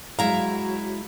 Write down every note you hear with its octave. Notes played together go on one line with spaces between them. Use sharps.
F#3 G#3 E4 F5 A#5